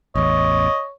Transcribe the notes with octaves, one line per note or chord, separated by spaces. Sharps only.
A1 E2 C#5 D#5